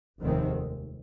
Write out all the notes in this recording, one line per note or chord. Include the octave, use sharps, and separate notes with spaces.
F1 D#2 D#3 G#3 C4